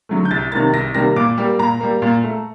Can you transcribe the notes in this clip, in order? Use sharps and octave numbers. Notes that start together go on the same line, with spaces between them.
D3 F#3 A3
G6
C2 A6
C3 D#3 G3 A#3 A6
C2 A#6
C3 D#3 G3 A#3 A#6
A#2 D6
G3 A#3
A#2 A#5
G3 A#3
A#2
A3